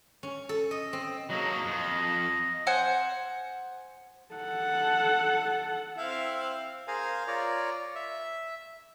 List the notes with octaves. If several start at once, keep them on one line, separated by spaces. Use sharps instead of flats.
C#4
A4
D#5
C4
F#3 A#3 D#5
F2
C5 F#5 G#5
A4 F#5
C4 E4 F5
G#4 A#4 C5 F5 G#5
F4 A#4 C#5 D5
E5